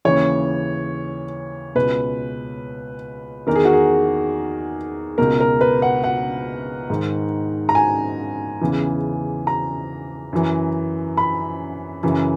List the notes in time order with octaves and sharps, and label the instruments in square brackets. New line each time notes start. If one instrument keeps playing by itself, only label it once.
[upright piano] D#2 C#3 E3 C#5
C#2 B2 B4
E2 D#3 A#4
G#4
F#4
G#4
C#2 B2 A#4
A#4
B4
F#5
F#5
G#2 D#3
A#5
G#5
E2 C#3 E3
A#5
F#2 E3
B5
F#2 C#3 E3